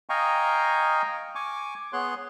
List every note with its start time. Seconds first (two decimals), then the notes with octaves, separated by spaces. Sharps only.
0.09 D#5 F5 G5 G#5 A#5 C#6
1.35 G#5 C#6 D6
1.93 B3 G#4 C#5 C6 F#6